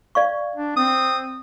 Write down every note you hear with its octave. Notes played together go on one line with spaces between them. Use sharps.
D5 F5 C#6
D4
C4 D#6